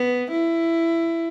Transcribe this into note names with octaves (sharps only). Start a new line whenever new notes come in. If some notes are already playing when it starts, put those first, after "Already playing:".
Already playing: B3
E4